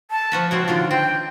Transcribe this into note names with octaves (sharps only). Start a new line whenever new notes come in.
A5
F3 F#4 B4
C#3 G#3 C4 F#4
D3 D#3 D4 F4
C4 G5